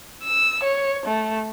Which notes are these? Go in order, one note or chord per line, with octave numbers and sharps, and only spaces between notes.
E6
C#5
A3